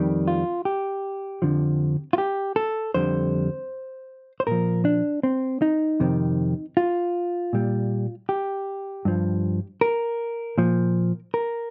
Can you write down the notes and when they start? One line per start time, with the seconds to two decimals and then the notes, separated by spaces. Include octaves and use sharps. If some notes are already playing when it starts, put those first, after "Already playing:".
Already playing: F2 D#3 G3
0.28 F4
0.65 G4
1.42 F2 D3 F3
2.13 F4
2.18 G4
2.56 A4
2.94 F2 D3 G3 C5
4.40 C5
4.47 A#2 F3 A#4
4.85 D4
5.23 C4
5.62 D#4
6.00 F2 C3 D#3
6.77 F4
7.53 A#2 G3
8.29 G4
9.05 G2 F3
9.81 A#4
10.58 A#2 F3
11.34 A#4